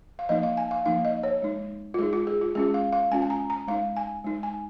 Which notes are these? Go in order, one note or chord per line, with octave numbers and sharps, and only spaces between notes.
F5
F3 A#3 D#4 D#5
F5
G#5
F5
F3 A#3 D#4 F5
D#5
C#5
G#3 D#4
F4
G#3 D#4 G#4
F4
G#4
F4
G#3 C#4 F4 G#4
F5
F5
G#3 C#4 F4 G#5
G#5
A#5
A#5
G#3 D#4 F5
G#5
G#3 D#4
G#5